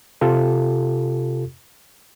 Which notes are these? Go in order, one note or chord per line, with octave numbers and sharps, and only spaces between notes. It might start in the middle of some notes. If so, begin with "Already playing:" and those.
C3 F4 G4 A4